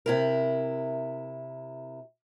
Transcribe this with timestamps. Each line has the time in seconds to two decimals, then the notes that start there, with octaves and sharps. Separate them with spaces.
0.06 C3 E4 A#4